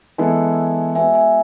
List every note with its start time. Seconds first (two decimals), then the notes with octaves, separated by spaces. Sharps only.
0.18 E3 G#3 B3 E4 A4 E5 G#5
0.95 G#3 B3 F#4 B4 E5 G#5
1.14 E5 G#5